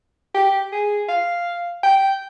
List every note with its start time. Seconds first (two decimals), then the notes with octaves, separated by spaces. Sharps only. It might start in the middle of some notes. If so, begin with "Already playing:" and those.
0.35 G4
0.72 G#4
1.09 F5
1.83 G5